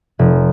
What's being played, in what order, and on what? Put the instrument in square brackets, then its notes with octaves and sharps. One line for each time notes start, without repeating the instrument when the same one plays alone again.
[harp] F1